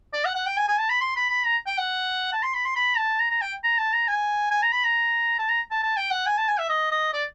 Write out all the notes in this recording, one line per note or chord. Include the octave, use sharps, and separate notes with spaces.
D5
F#5
F#5
G5
G#5
G#5
A5
B5
C6
B5
B5
A#5
G5
F#5
A5
C6
B5
C6
B5
A5
A#5
A#5
G5
A#5
A5
A#5
G#5
G#5
A#5
B5
A#5
A5
A#5
A5
A5
G5
F#5
G#5
A5
G#5
E5
D#5
D#5
D5